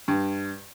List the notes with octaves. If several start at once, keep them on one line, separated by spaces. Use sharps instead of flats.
G2